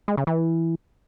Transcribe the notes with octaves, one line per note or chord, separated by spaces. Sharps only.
G#3
C#3
E3